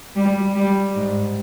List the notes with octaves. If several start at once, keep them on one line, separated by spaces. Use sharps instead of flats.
G3
G3
G#2